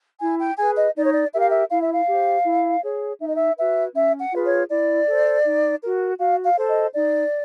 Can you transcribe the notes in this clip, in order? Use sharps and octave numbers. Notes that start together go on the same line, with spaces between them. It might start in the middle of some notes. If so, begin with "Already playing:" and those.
E4 G#5
G5
G#4 B4 G#5
D#5
D#4 D5
C#5
D5
G4 A#4 E5
F5
E5
E4 F5
E5
F5
G4 C5
E4
G#4 C#5
D#4 E5
D#5
E5
F#4 B4 E5
C#4 E5
F#5
F4 G#4 B4
C#5
E4 D5
A4 C5
D#4
F#4 A#4
F#4 F5
F5
A4 C5
D#5
D#4 D5